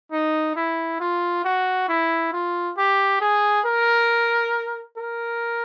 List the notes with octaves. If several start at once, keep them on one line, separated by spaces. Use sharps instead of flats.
D#4
E4
F4
F#4
E4
F4
G4
G#4
A#4
A#4